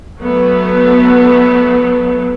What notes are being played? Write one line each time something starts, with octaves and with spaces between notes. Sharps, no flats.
F#3 A3 B3